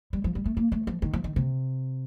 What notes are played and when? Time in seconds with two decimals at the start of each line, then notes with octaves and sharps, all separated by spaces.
0.13 G3
0.24 F3
0.35 G3
0.45 A3
0.57 A#3
0.72 A3
0.87 F3
1.02 D#3
1.13 F3
1.24 D#3
1.36 C3